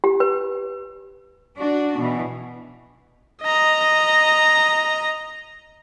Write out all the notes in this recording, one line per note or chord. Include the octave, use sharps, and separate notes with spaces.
G4
B4
D4 F#4
B2 E3
D#5 A#5